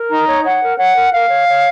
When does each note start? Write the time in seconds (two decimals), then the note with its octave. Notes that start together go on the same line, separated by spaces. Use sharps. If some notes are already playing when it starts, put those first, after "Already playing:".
Already playing: A#4
0.10 D#4 A#5
0.26 C#5
0.44 C#5 F#5
0.61 A#4
0.78 C#5 F#5
0.96 A#4
1.13 A#4 F5
1.30 C#5
1.48 C#5